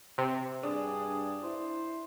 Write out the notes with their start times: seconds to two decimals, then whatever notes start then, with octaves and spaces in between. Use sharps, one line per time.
0.18 C3
0.63 G2 D4 G#4
1.43 E4 C5